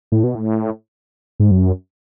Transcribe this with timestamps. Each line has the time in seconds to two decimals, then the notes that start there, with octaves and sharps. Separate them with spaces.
0.12 A2
0.24 B2
0.35 A2
1.40 G#2
1.51 F#2